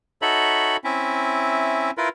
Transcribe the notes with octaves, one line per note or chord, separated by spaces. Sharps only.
D#4 F#4 A4 C#5 E5 B5
C4 C#4 E4 E5
E4 F4 A#4 B4